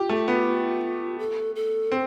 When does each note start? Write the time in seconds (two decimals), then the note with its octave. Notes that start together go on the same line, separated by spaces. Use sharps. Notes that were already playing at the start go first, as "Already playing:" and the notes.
Already playing: F4 G4
0.09 A3
0.28 B3
1.19 A4
1.56 A4
1.92 C4